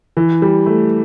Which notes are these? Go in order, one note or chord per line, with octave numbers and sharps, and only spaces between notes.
E3
G3
A3